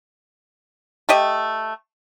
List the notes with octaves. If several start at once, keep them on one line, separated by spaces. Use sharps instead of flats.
A3 G4 D#5